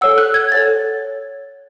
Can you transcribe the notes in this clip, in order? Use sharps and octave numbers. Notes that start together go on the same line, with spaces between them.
A4 C#5 F#5 E6
F#6
G#6
A4 C#5 F#5 A6